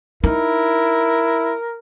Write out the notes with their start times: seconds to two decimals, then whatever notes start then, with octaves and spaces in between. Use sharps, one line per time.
0.24 D#4 E4 A#4